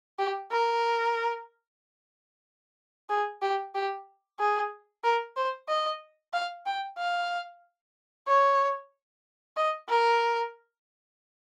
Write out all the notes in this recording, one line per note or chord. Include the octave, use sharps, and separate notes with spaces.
G4
A#4
G#4
G4
G4
G#4
A#4
C5
D#5
F5
G5
F5
C#5
D#5
A#4